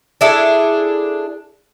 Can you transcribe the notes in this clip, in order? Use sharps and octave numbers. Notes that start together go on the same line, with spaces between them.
D4 E4 G#4 A4